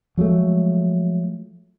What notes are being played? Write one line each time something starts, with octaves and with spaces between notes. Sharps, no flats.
F3 F#3 G#3 A3